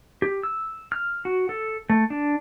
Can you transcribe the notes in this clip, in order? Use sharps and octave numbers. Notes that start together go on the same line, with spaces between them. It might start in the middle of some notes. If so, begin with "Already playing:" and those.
G4
E6
F6
F#4
A4
A3
D4